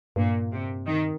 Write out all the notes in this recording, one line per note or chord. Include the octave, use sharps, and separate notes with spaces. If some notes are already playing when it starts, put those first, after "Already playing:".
G2 A#2
C3
D#3